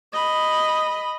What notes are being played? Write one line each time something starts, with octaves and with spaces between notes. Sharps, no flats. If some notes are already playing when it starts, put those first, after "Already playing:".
D#5 B5